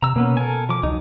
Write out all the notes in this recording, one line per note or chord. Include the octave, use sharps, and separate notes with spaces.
C3 A#5 E6
B2 A#3 B3 C#4
A4 A#4 G#5
F3 D6
C#2 F#3 D#4